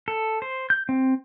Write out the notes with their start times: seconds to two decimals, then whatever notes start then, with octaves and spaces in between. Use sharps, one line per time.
0.08 A4
0.42 C5
0.70 G6
0.89 C4